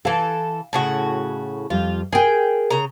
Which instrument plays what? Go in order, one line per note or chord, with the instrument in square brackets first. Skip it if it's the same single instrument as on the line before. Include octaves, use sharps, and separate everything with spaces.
[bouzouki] E3 A4 [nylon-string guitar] F5
[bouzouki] A2 C#3 F#4
[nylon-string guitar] F2 G3 [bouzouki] F4
[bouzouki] G#4 G5 [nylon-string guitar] A#4 G#5
[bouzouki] C#3 A#5